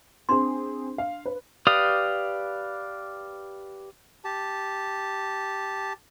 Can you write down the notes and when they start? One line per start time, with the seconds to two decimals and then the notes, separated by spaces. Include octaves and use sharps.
0.29 C4 D4 G#4 C6
0.98 F5
1.26 B4
1.67 G4 B4 D5 F5 D#6
4.24 G4 A5